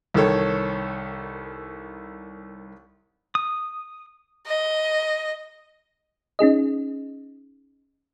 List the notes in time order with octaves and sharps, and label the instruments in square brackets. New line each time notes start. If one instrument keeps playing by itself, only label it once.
[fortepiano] C2 D#3 A4 C#5
[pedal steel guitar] D#6
[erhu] D#5
[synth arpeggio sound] C#4 D#4 G#4 D#5